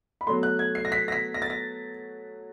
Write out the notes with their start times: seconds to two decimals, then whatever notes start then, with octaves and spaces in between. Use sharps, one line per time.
0.21 B5
0.27 B2 F#3 A3 C6
0.43 F#6
0.59 G#6
0.75 C7
0.85 A#6
0.92 B6
1.08 A#6
1.12 B6
1.34 A#6
1.42 A6
1.50 A#6